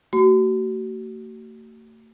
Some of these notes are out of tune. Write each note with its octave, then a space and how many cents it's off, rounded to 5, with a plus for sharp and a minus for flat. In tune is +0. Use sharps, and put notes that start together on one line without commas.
A3 +45 F#4 +35 C6 -45